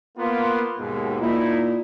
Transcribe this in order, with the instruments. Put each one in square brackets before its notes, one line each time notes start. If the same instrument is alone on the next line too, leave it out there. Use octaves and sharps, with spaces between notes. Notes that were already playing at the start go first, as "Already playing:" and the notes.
[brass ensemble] A#3 B3 F4
D#2 G#2 B2
[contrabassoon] A#2 [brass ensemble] D#4 E4